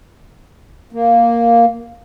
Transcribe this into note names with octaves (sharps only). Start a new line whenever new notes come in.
A#3